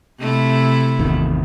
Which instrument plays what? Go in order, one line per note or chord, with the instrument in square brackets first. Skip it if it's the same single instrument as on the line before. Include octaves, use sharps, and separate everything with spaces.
[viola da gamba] C3 A3 E4
[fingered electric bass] G#1 E2 D#3